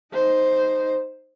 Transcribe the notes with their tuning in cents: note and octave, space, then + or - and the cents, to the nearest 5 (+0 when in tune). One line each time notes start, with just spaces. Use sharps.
D#4 +0 C5 +0